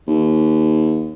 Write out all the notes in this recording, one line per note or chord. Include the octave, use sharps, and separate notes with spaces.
D#2